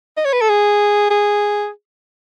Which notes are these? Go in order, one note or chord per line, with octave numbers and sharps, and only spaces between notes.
D#5
C#5
B4
A4
G#4
G#4